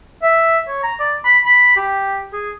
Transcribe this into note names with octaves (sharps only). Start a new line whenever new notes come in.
E5
C#5
A#5
D5
B5
B5
G4
G#4